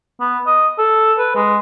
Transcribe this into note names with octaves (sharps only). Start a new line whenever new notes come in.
B3
D#5
A4
B4
G#3